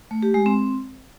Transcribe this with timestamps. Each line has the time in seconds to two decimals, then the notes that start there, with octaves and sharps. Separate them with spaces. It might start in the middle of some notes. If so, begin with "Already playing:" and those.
0.11 A3
0.23 G4
0.34 G#3
0.46 C4